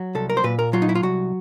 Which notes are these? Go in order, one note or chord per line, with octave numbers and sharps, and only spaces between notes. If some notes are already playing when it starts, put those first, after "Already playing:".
Already playing: F#3
C2 A4
A#4
C5
A#2 B4
A#4
F#3 F4
D#4
E4
F4
C2 F#4